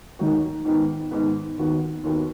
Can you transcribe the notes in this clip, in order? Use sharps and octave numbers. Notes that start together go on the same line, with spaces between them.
D#2 D#3 F#3 D#4 F#4
G#2 D#3 B3
G#2 D#3 B3
D#2 D#3 B3 F#4
D#2 D#3 B3 F#4